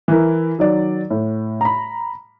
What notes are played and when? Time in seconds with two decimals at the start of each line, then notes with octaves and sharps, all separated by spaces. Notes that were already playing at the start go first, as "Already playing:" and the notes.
0.08 E3 E4 A#4
0.59 D#3 F#3 D5
1.10 A2
1.61 A#5 B5